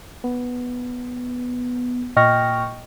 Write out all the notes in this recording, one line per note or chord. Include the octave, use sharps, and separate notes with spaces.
B3
A#2 D#5 G5 C#6 F6 A#6